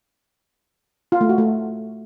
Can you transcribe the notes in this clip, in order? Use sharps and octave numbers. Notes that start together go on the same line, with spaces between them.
F4
A3
F#4
A3